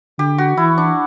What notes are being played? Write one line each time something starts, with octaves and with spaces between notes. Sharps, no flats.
D3 G4
F#4
E3 E4
D4